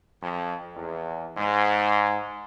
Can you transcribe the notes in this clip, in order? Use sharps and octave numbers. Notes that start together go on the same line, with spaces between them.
F2
E2
G#2